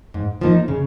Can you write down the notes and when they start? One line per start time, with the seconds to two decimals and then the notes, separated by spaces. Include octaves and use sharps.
0.14 G#2
0.41 F3 A#3 D#4
0.68 C#3